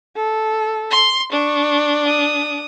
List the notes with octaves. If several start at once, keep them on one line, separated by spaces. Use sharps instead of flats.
A4
C6
D4 C#6
D#6